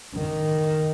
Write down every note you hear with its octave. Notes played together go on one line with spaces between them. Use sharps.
D#3